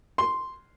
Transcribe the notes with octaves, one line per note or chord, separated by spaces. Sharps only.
C6